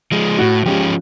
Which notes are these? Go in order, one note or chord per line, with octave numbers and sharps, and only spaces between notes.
F3 G#3
A2 F#4
F3 G#3 C#4 F4 G4